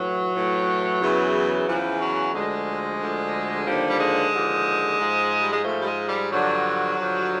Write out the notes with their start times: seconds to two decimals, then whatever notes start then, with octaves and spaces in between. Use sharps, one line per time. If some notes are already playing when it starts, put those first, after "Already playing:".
Already playing: A2 E3 F#3
0.35 A2 E3
1.01 E2 C#3 E3
1.68 E2 C#3 E3 F3
2.01 F#3
2.33 D2 D3 F3 G#3
2.99 D2 D3 F3
3.65 D#2 D3 F3 G3
3.90 G3
3.99 G#3
4.32 D#2 D3 F3
4.99 G#2 F3
5.41 G3
5.53 G#3
5.64 G#2 F3 A3
5.80 G3
5.87 G#3
6.08 G3
6.30 G2 D3 F3 F#3
6.97 G2 D3 F3